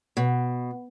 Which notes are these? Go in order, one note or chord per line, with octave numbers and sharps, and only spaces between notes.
B2